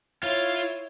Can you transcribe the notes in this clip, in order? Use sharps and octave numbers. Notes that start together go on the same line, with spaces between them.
E4 F4 C#5 F5